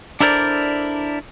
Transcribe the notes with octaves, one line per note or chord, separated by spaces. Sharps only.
D4 E4 A4 A#4 C5 D5